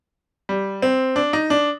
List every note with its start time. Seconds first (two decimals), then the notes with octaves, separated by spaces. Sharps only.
0.49 G3
0.82 C4
1.16 D4
1.33 D#4
1.50 D4